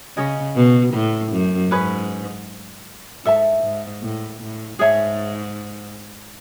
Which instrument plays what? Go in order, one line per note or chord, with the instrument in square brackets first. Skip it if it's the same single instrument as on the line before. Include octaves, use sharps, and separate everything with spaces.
[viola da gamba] C#3 [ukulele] C#4 G#4 D#5
[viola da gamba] B2
A2
F#2
[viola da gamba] G#2 [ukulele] C#4 G#4 B4
[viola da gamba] G#2 [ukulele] A4 E5 A5
[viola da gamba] G#2
A2
A2
[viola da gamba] G#2 [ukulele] G#4 C#5 E5 A5